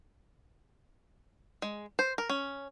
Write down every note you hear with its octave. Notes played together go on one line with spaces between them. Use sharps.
G#3
C5
A#4
C#4